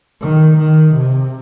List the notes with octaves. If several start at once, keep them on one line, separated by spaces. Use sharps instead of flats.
D#3
D#3
C3